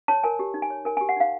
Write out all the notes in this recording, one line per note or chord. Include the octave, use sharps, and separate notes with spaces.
C#5 A5
A#4 G#5
G4
D#4
G#5
C#5
A#4 G#5
G4 G#5
F#5
D#4 F5